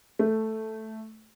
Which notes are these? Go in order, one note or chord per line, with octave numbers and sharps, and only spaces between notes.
A3